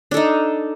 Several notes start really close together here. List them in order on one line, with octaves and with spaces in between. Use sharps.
D4 A4 D#4